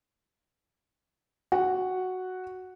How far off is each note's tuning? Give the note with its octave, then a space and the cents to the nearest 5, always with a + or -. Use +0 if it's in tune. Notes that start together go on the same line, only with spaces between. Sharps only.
F#4 +0 F#5 +0